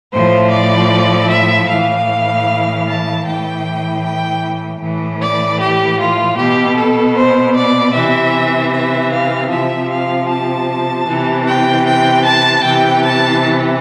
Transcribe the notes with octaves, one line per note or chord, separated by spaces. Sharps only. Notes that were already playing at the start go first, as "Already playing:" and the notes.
A2 F3 C5
D5
E5
A2 E3 F5
A5
A2 E3 G5
G5
A2 E3
D5
G4
F4
B2 G4
A4
C5
D5
C3 E3 E5
E5
F5
C3 F3 E5
F5
A5
C3 E3
G5
G5
A5
C3 E3 G5
A5